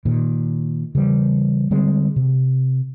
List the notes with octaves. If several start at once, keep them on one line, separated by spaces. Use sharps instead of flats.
A#2 D#3
C#3 E3 G3
D3 G3 G#3 C4
C3